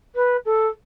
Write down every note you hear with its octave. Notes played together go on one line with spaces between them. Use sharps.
B4
A4